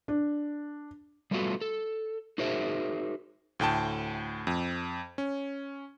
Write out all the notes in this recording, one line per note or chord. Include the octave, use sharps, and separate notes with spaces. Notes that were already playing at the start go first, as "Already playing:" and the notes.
D4
G3 A3 B3 F4 F#4 A4
A4
D#4 F#4 G#4 A#4 C5 E5
D2 A2 G5 A5
F2
C#4